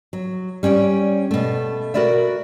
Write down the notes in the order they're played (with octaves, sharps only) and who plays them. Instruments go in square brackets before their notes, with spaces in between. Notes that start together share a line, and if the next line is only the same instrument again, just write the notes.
[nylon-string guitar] F#3
G3 C#4 C#5 D5
B2 A3
F#4 A#4 B4 D5 E5